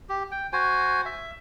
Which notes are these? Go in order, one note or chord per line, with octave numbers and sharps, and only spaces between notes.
G4
G5
F#4 C5 G#5
E5